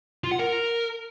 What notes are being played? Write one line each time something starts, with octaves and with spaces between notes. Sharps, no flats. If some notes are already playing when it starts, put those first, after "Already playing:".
F4
F#5
A#4